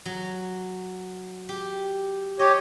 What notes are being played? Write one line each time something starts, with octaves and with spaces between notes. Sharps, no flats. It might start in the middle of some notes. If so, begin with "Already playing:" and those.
F#3
G4
G4 C#5 D#5